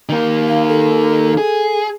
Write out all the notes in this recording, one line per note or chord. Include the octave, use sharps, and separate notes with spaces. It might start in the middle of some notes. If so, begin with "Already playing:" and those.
D#3 A#3
F5
A4
G#4